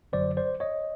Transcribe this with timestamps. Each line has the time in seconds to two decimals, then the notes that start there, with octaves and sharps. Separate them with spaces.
0.12 G1 F#2 D3 F#3 C5 D5
0.37 C5 D5
0.60 C#5 D#5